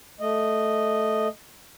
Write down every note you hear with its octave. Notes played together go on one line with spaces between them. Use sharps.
A3 D#5